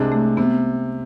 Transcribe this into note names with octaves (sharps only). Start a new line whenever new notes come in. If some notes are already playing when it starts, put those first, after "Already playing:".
Already playing: C2 C3 G#3 D4
A3
C3 B3